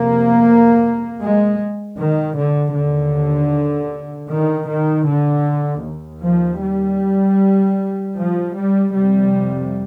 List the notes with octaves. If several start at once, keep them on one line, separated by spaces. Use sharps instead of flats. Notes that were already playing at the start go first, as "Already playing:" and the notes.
Already playing: F2 C3 A#3
G#3
D#3
D3
D#2 D3
D#3
D#3
D3
D#2
F3
G3
F3
G3
F2 C3 G3